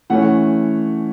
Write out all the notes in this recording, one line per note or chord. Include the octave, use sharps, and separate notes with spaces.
E3 A3 C#4 F#5